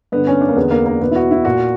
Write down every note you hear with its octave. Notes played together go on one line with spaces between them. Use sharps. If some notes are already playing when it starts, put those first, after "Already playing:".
G2 D3 B3
C#4
D4
A#3
E2 D3 B3
A#3
A#3
E2 B2 B3
E4
F#4
E4
A#2 F#4